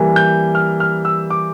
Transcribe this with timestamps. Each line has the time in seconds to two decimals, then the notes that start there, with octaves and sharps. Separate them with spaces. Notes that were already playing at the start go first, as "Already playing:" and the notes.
Already playing: E3 G3 A#3
0.16 G6
0.55 F6
0.80 F6
1.05 E6
1.30 D6